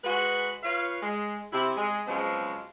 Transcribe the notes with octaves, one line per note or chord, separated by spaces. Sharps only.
G#3 F#4 B4
F4 B4 C#5 F5
G#3
C3 E4
G#3
C#3 F3 F#3 G#3 B3 C4